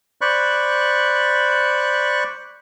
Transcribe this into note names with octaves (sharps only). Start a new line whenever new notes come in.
C5 D5 B5 C#6 F#6